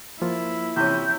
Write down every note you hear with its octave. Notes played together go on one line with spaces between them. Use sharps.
F3 A#3 E4 F4
C3 E3 C#4 G6